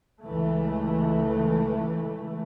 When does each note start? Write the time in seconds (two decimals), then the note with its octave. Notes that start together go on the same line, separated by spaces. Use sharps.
0.22 C#2 E3 A3